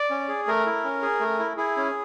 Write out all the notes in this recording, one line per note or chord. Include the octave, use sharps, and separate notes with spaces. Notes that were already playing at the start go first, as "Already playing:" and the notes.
Already playing: D5
C#4
G#4
A3 A#4
E4
C#4
G#4
A3
E4
E4 G#4
C#4